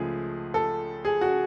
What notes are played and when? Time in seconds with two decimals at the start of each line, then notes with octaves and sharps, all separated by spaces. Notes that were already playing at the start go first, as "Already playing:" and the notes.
Already playing: C#2 C#3 F3 A3 G#4
0.54 A4
1.05 G#4
1.21 F#4